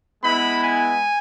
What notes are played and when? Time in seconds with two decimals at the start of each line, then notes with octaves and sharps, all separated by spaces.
0.22 G#3 B3 E4 B5
0.60 G#5